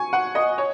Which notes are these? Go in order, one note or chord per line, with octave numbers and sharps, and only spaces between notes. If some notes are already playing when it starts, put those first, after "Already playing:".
Already playing: G#5 C#6
F#5
D#5
C#5